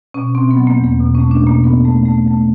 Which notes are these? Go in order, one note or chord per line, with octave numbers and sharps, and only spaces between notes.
B2 C#4
B2 C4
B3
F#3
A#3
E2
A#3
B2
C#4
A3
D4
B2
A#3
A2 B3
A3
A3
A3